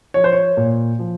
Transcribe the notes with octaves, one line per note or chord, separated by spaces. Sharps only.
F3 C#5
C5
C#5
A#2
F3